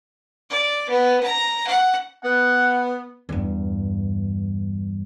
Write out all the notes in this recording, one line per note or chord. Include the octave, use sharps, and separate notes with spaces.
D5
B3
A#5
F#5
B3 F#5
E2 G2